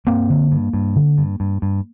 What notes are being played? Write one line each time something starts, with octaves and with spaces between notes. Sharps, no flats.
G2 A#3 C4
D3
G2
G2
D3
G2
G2
G2